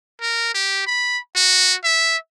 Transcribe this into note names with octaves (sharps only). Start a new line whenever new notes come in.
A#4
G4
B5
F#4
E5